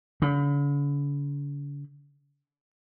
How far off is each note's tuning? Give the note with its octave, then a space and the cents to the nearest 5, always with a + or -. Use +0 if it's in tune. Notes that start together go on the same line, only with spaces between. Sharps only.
D3 -45